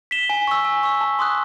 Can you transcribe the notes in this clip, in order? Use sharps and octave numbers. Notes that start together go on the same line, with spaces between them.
B6 E7 G7
G#5
C#6 E6
G#5
C#6 E6
A5
C6 D#6 F#6